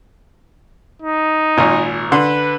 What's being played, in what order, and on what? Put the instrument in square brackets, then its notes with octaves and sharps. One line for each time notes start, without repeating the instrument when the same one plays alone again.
[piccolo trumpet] D#4
[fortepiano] G#1 A#2
[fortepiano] D3 C6 [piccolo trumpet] B4